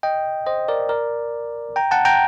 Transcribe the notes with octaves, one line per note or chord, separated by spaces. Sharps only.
D#5 G5
C5 D#5
A#4 D5
A#4 D5
G5 A#5
F#5 A5
G5 A#5